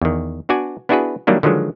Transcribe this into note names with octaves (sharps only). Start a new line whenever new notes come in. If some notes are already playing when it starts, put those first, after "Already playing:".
E2 D#3
B3 D4 F#4 D5 G#5
B3 D4 E4 F#4 G#4 B4
D#3 F#3 G3 A#3 D4 E4
D3 D#3 F3 F#3 G#3